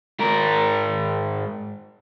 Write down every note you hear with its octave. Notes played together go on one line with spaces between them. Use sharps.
G#2 A#4